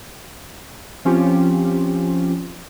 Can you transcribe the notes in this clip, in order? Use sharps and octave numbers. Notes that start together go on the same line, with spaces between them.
F3 C4 C#4 F4 G4